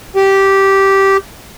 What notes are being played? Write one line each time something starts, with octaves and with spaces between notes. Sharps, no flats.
G4